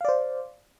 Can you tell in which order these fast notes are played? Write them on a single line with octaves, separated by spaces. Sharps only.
F5 D5 C5